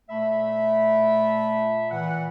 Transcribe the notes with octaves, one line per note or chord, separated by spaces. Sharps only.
A#2 A3 E5 B5
A#2 E3 F#5